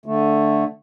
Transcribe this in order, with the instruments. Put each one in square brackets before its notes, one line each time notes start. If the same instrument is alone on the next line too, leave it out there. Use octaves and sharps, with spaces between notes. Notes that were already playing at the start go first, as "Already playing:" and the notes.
[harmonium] D3 A3